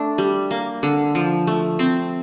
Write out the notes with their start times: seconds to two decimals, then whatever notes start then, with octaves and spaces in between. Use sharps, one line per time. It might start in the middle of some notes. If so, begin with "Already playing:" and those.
Already playing: A3 D4
0.18 G3
0.51 A#3
0.83 D3
1.15 F3
1.47 A3
1.79 C4